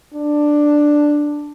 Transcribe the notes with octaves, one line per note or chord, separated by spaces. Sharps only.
D4